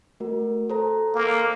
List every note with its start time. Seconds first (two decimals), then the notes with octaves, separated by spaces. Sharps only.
0.20 A3 F#4 A#4
0.70 A4 C5 A#5
1.15 A#3